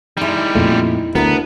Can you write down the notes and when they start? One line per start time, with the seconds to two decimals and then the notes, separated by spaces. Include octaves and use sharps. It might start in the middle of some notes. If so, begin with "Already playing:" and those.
0.17 G3 G#3 D#4 E4
0.55 F2 A#2 A3
1.15 D2 B3 D4 E4 A#4